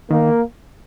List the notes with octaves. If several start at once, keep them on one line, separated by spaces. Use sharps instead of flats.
D#3 A#3